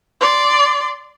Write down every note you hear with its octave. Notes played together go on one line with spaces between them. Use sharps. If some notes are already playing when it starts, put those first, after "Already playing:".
D5 C6